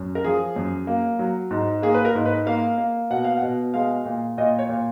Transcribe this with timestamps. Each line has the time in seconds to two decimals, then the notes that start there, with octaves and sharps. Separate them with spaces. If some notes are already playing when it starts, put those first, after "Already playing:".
Already playing: F#2
0.15 A#4
0.24 F3 G#4
0.56 F#2
0.87 A#3
1.19 F#3
1.51 G#2
1.82 A#3 G#4
1.94 B4
2.05 A#4
2.15 G#2
2.26 B4
2.46 A#3 F5
2.78 A#3
3.10 B2 F#5
3.24 F5
3.37 F#5
3.42 B2
3.74 G#3 F5
4.05 A#2
4.38 A#2 D#5
4.59 C#5
4.69 A#2